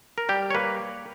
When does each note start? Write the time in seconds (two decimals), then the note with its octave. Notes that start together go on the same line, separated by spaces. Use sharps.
0.18 A#4
0.29 G3 G4
0.50 C#5
0.55 A#3 B4